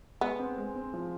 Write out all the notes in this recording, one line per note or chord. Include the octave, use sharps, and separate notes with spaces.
G#3 B3
C4
G#3
C4
F3